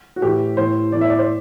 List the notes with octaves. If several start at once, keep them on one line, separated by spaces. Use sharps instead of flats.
F#4
A2 E3 G4
A2 E3 C5
A2 E3 D5
E5
D5
C5